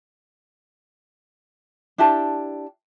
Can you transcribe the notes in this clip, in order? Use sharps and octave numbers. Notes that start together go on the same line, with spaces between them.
D4 E4 G4 A5